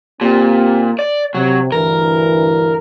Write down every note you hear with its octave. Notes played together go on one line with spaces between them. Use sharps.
A#2 C4 G4
D5
C3 F#3
D2 G2 E3 A#4